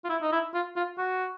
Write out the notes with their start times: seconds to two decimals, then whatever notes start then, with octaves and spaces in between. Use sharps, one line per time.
0.04 F4
0.09 E4
0.22 D#4
0.32 E4
0.54 F4
0.76 F4
0.98 F#4